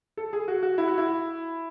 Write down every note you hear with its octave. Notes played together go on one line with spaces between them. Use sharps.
A4
G#4
F#4
F#4
E4
F#4
E4